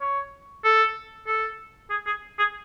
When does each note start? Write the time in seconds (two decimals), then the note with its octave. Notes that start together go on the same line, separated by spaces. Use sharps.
0.01 C#5
0.64 A4
1.27 A4
1.90 G#4
2.06 G#4
2.39 G#4